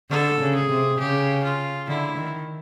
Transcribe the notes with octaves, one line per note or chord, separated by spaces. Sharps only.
D3 A4
C#3
G#4
C3
C#3 G4
F4
D3 E4
D#3